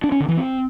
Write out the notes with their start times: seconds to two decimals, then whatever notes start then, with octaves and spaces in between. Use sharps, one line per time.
0.04 D4
0.12 C#4
0.20 D3
0.28 E3
0.37 C4